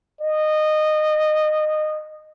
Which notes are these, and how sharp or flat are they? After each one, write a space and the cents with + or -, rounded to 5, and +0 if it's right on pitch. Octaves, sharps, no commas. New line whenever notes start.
D#5 -20